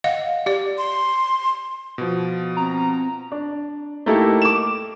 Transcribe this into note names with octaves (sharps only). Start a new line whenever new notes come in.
D#5 F5 F#5
G4 D5
C6
B2 F3
C4 A#5
D4
A3 A#3 D#4 E4 G4 A4
D6 E7